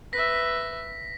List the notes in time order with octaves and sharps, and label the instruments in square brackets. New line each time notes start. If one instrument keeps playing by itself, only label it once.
[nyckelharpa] B4 E5 [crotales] A#6 B6